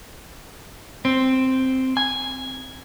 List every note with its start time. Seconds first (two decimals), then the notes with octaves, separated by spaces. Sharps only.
1.05 C4
1.97 G#5